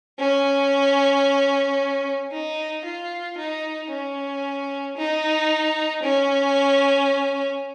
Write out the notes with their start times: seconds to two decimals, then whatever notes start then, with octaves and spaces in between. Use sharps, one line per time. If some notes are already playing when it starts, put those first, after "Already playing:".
0.19 C#4
2.31 D#4
2.85 F4
3.37 D#4
3.90 C#4
4.97 D#4
6.03 C#4